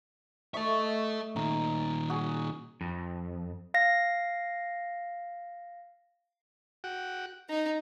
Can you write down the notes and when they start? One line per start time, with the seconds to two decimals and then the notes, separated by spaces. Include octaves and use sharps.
0.54 A3 A4 D#5 E5 C#6
1.36 A#2 D#3 A#5
2.10 F#4 G#4
2.81 F2
3.74 F5 A#6
6.84 F#4 F#5 G5
7.49 D#4 A#5